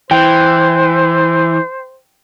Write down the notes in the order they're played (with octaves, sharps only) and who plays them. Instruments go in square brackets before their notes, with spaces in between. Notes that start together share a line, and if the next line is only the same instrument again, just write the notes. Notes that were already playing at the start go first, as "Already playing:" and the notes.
[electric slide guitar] E3 [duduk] C5 [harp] G5